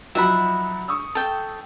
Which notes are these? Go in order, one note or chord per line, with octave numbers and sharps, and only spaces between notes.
F3 F#3 D#4 E5 F#5 B5
C#6 D#6 E6
A4 G5